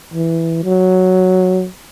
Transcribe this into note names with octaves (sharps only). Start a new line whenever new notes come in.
E3
F#3